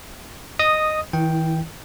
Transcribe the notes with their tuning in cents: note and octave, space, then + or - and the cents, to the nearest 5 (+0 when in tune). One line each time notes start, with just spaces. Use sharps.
D#5 -10 D#6 +0
E3 -40 E4 +0 G5 +0